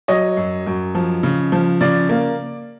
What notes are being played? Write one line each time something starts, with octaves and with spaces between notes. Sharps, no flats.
F#3 C#5 D#5
F#2
F#2
F3
C#3
F3
C#3 D5
A#3